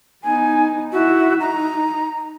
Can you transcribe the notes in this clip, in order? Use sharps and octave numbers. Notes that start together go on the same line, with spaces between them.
B3 D#4 G#5
E4 F#4 E5
D#4 A#5